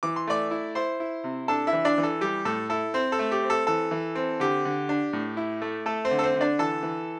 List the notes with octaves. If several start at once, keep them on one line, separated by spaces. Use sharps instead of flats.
E3 D6
C6
A3 D5 D6
E4
E4 C5 C6
E4
C3
D4 A4 A5
E4 E5
E3
D4 D5
E3
A4
G3 G4
A2 A4
E4 A4
C4 C5
A4
A3
G4
C4
A4
E3 A4
E3
C4
D3 G4
D3
D4
A2
E4
A3
A3 A4
C4 C5
D3
A4
C4 C5
D3
D4 D5
E3 A4 A5
E3